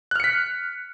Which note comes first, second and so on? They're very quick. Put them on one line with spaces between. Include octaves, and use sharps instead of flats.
F#6 F6 C#7 B6